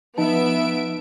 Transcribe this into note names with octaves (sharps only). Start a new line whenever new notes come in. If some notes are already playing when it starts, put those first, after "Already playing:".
F3 B3 D#4 E5 A5 D7